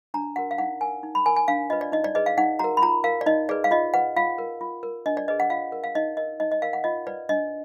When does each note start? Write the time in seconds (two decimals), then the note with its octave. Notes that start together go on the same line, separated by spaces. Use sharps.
0.14 D4 A#5
0.36 F#4 A#4 F#5
0.51 F5
0.58 D#4 F#5
0.81 A#4 G#5
1.03 D#4
1.15 B5
1.26 A#4 G#5
1.36 G#5
1.48 D4 F5
1.70 F4 B4 D#5
1.81 D5
1.92 D#4 D#5
2.04 D5
2.15 G#4 B4 D#5
2.26 F5
2.38 D#4 F#5
2.59 F#4 A#4 A#5
2.77 B5
2.82 F4 A#5
3.04 A#4 F5
3.21 D5
3.26 D#4 D#5
3.49 G#4 B4 D5
3.64 F5
3.71 F4 D#5
3.94 B4 F#5
4.16 F4 F5
4.38 A#4
4.61 F4
4.83 A#4
5.06 D4 D#5
5.17 D5
5.28 G#4 B4 D#5
5.40 F#5
5.50 F4 F5
5.72 A#4
5.84 F5
5.95 D#4 D#5
6.17 A#4 D#5
6.40 D#4 D#5
6.52 D#5
6.62 A#4 F5
6.73 F#5
6.84 F4 D#5
7.07 B4 D5
7.29 D4 D#5